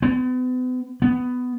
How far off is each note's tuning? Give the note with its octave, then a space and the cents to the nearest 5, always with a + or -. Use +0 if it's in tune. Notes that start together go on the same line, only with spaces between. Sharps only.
B3 +40
B3 +10